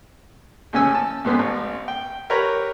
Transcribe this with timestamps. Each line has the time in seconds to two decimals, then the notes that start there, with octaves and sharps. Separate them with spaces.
0.73 D#2 A2 C#3 C#4 G#5 E6
0.95 A5
1.25 F2 G#2 B3 C#4
1.39 A1
1.88 G5
2.30 G4 A#4 B4 C#5 A#5 B5